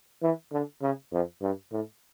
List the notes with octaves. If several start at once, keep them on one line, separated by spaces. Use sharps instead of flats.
E3
D3
C#3
F2
G2
A2